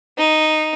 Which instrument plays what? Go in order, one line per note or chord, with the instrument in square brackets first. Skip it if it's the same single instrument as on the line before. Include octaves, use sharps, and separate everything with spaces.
[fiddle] D#4